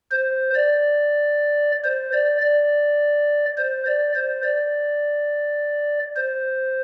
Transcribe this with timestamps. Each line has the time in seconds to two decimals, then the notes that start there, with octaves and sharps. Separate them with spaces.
0.11 C5
0.55 D5
1.84 C5
2.13 D5
2.41 D5
3.57 C5
3.86 D5
4.15 C5
4.43 D5
6.16 C5